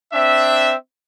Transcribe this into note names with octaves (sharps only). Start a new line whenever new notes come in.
C4 D4 E5